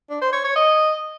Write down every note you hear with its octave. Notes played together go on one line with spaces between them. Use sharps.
D4
C5
C#5
C#5
D#5